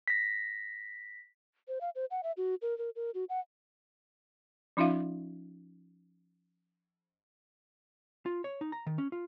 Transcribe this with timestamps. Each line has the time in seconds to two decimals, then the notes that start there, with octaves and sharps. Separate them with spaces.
0.08 A#6 B6
1.68 C5
1.81 F5
1.95 C5
2.11 F#5
2.23 E5
2.37 F#4
2.62 A#4
2.78 A#4
2.96 A#4
3.14 F#4
3.30 F#5
4.77 F3 C#4 D#4 F4 E5 F5
8.26 F4
8.44 C#5
8.61 D#4
8.72 A#5
8.86 D#3
8.98 C#4
9.12 F4